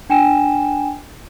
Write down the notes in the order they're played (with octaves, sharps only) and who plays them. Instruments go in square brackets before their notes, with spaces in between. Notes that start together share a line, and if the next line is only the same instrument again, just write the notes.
[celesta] D4 G5 G#5 E7